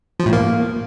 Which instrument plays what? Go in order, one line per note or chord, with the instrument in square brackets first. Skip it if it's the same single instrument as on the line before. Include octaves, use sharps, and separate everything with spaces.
[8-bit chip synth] F3
A2
A#3